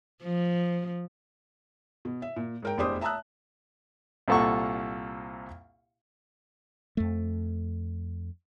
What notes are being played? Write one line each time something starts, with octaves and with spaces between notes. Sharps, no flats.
F3
B2
E5
A#2
G#2 A#4 G5
F1 E2 D4 G4 C5 D#6
E5 A5 A#5 D#6 E6 F#6
C2 A#2 A4 F#5 C#6
F2 A3